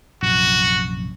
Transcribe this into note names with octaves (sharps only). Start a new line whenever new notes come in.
A#1 F#2 C3 F#4